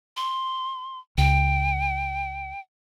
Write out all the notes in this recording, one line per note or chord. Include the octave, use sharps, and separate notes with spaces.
C6
C#2 G5